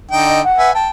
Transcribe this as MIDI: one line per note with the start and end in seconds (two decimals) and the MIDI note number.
0.11 0.41 50
0.11 0.41 63
0.11 0.41 79
0.28 0.42 75
0.44 0.71 78
0.58 0.71 71
0.58 0.71 76
0.58 0.71 80
0.74 0.91 79
0.74 0.87 81